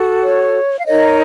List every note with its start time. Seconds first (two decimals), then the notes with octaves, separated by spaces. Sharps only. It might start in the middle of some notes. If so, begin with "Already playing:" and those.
Already playing: F#4 A4
0.22 C#5
0.78 F5
0.86 D#4 A#4 C#5 D#5